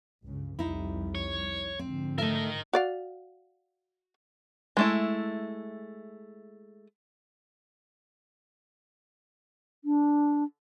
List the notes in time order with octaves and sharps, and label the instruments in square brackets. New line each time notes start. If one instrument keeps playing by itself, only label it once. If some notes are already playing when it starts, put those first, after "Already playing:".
[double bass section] C#2 G2 C#3
[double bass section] C2 F2 G3 [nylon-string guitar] D#4 E4
[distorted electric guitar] C#5
[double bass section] G#2 D3 F3 [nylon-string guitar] C4
[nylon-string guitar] A3 A4 E5 [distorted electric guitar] A#4 D#5
[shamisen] F#4 D5 F5
[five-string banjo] G#3 A3 E4
[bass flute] D4